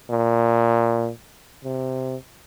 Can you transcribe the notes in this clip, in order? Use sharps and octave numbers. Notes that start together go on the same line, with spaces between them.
A#2
C3